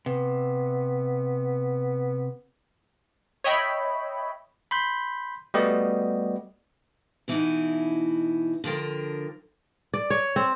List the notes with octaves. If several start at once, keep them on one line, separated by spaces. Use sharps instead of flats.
C3 B3
C#5 D#5 E5 G5 B5
B5 C6 G6
G3 A3 B3 F#4 G4 D#5
B2 E3 D#4 E4 F#4
D3 F3 A#4 G5
D5
C#5
C4